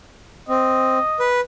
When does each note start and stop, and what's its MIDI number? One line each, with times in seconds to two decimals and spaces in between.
0.49 0.99 60
0.49 1.28 75
1.19 1.41 71